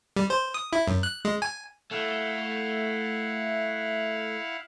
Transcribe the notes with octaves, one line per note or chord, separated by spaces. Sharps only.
G3
C5
D#6
E4
F#2
F#6
G#3
G#5
A3 E4 F5 F#5